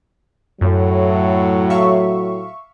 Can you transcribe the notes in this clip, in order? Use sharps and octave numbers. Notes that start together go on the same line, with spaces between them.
F#2 A2 F#3
E5 F5 C#6